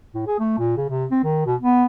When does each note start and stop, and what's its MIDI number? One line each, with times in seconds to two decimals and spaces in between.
0.14 0.24 45
0.27 0.37 68
0.39 0.53 57
0.58 0.75 46
0.77 0.84 49
0.89 1.05 48
1.11 1.19 60
1.23 1.44 51
1.46 1.55 47
1.60 1.86 59